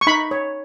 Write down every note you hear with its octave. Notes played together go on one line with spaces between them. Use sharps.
C#6
D#4 B5
C#5